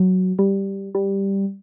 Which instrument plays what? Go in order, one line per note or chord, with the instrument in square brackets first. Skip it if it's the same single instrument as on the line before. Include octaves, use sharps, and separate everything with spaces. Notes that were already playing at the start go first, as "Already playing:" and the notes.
Already playing: [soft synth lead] F#3
G3
G3